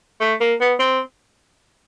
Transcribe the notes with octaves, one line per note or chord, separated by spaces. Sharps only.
A3
A#3
B3
C4